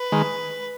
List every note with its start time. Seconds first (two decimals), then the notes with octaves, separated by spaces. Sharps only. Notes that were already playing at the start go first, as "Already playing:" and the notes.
Already playing: B4
0.12 D#3 G#3